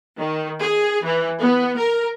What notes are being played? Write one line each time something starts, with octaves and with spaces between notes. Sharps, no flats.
D#3
G#4
E3
B3
A#4